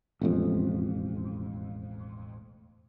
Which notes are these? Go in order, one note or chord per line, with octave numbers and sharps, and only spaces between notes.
E1 A1 F2